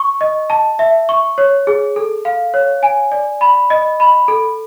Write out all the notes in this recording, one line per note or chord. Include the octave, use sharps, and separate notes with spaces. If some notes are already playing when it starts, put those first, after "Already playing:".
Already playing: C#6
D#5
A5
E5
C#6
C#5
G#4
A4
F5
C#5
G#5
D5
B5
D#5
B5
A4